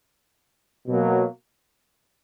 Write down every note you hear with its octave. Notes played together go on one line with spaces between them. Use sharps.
B2 F#3 A#3